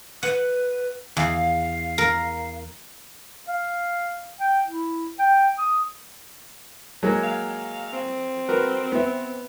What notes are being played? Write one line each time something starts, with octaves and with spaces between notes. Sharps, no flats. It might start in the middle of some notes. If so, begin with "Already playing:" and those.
B4 F#5
E2 F5
A#4
F5
G5
E4
G5
D#6
F#3 G#3 A#3
F5
C4
F#4 A#4 B4
B3 E5